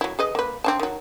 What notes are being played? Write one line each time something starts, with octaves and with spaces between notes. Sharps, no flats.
F#3 E4
G#4 B4 D#5
A#3 B4
C4 D4 A5
D#3 F#3